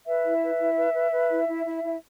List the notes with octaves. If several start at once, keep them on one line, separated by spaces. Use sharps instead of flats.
B4 E5
E4
B4
E4
B4
B4
B4
E4
E4
E4
E4